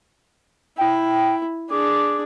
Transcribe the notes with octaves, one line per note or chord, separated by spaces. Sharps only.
E4 G5
D4 G#4 D6